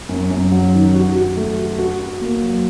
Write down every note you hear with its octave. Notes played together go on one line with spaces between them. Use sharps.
F#2
F#2
F#3
D#3
F#4
F#4
A3
F#4
F#4
F#4
A#3
F#3